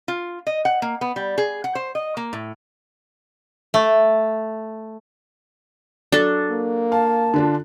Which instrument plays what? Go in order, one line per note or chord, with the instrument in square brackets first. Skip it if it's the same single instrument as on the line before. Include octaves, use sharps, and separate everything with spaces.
[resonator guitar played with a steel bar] F4
D#5
F#5
A#3
B3
G3
G#4
F#5
C5
D#5
A#3
A2
[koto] A3
[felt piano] F#3 [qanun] D4 A4
[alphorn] A#3
[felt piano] F5 [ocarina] A5
[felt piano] D3 D4 F4